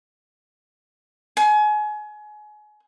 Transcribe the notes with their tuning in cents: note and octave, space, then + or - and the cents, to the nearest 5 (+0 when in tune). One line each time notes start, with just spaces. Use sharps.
G#5 +30